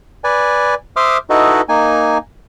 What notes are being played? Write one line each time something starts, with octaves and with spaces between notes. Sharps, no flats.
B4 D5 G#5
C5 E5 C6 D6 D#6 F6
D#4 E4 F#4 A4 B4 D#5
A#3 D#4 G#5